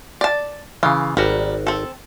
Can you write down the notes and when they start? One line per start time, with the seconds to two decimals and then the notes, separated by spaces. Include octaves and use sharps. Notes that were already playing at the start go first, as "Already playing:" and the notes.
0.21 D5 A5
0.83 C#3 E3 F4
1.17 G#1 G3 F#4 A#4
1.67 C4 A4